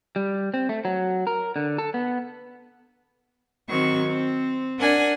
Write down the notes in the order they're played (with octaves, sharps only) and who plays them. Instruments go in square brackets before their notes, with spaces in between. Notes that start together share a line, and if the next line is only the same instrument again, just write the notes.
[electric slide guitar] G3
C4
A3
F#3
A#4
D3
A4
B3
[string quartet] D#3 F#3 C4 C#6
C4
D4 A#4 F#5 G#5